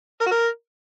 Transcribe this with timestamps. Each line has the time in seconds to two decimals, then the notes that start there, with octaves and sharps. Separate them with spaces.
0.21 A#4
0.26 F#4
0.31 A#4